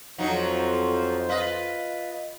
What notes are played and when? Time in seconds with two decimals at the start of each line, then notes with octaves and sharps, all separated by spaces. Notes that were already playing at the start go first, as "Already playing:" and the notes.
0.18 F2 F3 F#3 D#4 C5
1.29 F4 B4 D#5